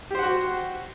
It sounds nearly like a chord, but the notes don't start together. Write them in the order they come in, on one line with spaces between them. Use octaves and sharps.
G4 C5 F#5 F#4